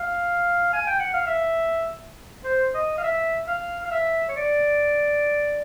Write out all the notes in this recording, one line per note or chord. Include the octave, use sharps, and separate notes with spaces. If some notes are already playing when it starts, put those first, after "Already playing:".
Already playing: F5
G#5
G5
F#5
F5
E5
C5
D#5
F5
E5
F5
F5
E5
C#5
D5